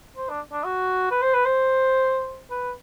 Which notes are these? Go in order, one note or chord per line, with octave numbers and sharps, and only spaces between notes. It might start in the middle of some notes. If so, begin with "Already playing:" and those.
C5
D4
D4
F#4
B4
C5
B4
C5
B4